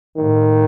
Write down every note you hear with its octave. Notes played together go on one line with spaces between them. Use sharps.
A2 D#3